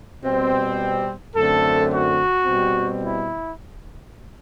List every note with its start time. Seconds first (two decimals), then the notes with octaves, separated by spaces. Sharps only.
0.23 B2 G3 C4
1.34 F#2 D3 A3 C4 A4
1.90 F#4
2.44 B2 G3 C4
3.01 E4